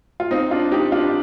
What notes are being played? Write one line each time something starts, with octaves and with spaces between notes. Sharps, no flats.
F4
C4 D#4
D4 F4
D#4 G4
D4 F4